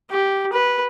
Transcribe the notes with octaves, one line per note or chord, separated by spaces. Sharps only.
G4
B4